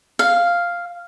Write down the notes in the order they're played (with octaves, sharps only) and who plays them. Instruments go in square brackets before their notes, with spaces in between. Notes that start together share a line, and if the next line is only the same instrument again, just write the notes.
[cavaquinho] F5